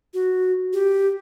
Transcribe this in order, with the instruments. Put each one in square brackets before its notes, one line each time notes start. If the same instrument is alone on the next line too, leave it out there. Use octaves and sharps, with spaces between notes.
[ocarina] F#4
G4